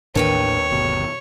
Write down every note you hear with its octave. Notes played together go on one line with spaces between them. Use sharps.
A1 D#2 A2 D4 B4 C#5 G5
G1 B2